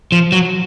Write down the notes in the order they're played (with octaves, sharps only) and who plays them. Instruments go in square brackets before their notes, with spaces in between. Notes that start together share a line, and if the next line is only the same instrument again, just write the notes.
[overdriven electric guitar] F3
F#3